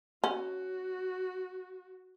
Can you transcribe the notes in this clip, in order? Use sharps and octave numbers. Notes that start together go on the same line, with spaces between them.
C#4 F#4